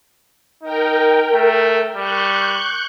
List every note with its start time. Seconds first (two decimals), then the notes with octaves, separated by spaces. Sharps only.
0.63 D#4 A#4 G5
1.34 A3
1.96 G3 C#6 F#6 G6